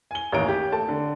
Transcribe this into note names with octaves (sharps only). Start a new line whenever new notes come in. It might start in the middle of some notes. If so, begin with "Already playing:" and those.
G#5 G7
A1 D#2 C#5 A#5 D7
G4
A3 A5
D3